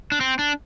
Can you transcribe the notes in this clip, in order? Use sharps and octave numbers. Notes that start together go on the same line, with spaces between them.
D4
C4
D4